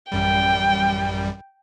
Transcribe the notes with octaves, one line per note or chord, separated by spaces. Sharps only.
A1 F#2 G3 G5